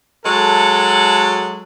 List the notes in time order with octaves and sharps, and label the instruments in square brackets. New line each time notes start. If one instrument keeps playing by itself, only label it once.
[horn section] F#3 G#3 A4